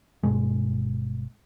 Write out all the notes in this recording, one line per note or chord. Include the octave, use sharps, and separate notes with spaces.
G1 G2 B2 G#3